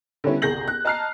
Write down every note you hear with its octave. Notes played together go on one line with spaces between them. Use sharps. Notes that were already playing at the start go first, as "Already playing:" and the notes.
D3 G3 B3 C#4 E4
G1 C2 G#4 G6 A#6 F#7
F#6
D#5 A5 A#5 F6 F#6 C7